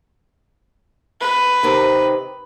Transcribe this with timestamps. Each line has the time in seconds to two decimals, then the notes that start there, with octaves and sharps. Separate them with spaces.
1.21 B4
1.63 C3 D#3 C4